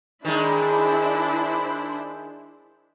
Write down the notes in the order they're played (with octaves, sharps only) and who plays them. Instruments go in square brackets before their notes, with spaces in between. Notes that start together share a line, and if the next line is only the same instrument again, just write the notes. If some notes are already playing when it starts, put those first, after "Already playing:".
[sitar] D#3 G#3 [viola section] D4 E4 C5